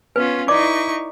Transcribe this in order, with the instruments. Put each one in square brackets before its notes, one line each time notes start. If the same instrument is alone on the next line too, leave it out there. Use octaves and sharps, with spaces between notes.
[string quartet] B3 C#4 F4 [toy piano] B4
[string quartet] D#4 E4 C#6 [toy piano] D5 D6